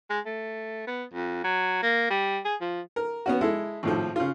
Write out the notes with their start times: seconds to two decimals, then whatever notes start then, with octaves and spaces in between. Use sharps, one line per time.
0.10 G#3
0.26 A3
0.87 B3
1.14 F2
1.44 F#3
1.83 A#3
2.10 G3
2.45 G#4
2.61 F3
2.96 A#4
3.26 B3 C#4 F#4
3.41 G#3 E4 A4
3.83 G#1 A2 F3
4.16 C#3 F4